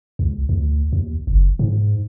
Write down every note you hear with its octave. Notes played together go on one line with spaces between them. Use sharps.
C#2
D2
D#2
F#1
G#2